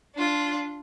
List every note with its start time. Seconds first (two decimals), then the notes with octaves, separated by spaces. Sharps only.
0.16 D4 F4